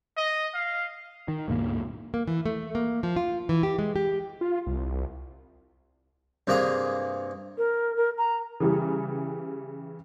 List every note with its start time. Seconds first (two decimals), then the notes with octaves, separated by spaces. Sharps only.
0.17 D#5
0.54 F5
1.28 D#3
1.48 C#2 G2 A#2 A#3
2.14 A#3
2.28 E3
2.46 A3
2.75 A#3
3.03 F3
3.16 F4
3.49 E3
3.63 G4
3.79 G#3
3.96 G4
4.41 F4
4.67 C2
6.47 G2 C3 A#3 G#4 A#5 D#6
7.58 A#4
7.97 A#4
8.18 A#5
8.60 C#3 E3 G3